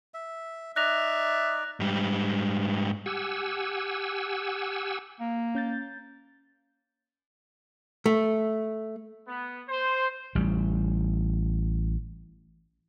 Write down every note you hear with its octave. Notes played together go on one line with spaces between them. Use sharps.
E5
D#4 D5 E5 F#6 A#6 F7
G#2 G3
G4 F#5 G#5 E6
A#3
C#4 G6 A6
A3
B3
C5
A1 G3